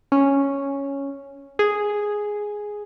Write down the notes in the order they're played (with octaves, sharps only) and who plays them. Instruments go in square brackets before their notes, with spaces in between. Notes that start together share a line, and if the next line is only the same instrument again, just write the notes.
[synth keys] C#4
G#4